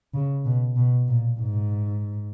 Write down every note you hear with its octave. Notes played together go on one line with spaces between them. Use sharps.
C#3
B2
B2
A#2
G#2